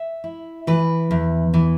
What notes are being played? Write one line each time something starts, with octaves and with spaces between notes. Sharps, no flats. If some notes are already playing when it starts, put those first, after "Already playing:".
Already playing: E5
E4
E3 B4
E2
E3